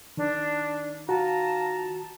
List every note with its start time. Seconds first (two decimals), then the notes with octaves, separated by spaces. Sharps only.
0.17 D#3 D4
1.09 F4 F#4 A5 A#5